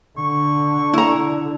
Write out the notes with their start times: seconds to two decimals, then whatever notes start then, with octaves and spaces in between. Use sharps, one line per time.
0.18 D3 C#6
0.93 E4 A#5